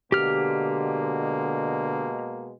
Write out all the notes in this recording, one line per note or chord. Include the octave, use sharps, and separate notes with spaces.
B2 D3 G#3 A#3 G4 F6